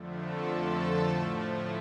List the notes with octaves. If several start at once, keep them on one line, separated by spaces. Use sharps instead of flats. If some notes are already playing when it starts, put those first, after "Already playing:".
Already playing: F2 D3 F3 A3
A4
A4
A4
A2 F3 A3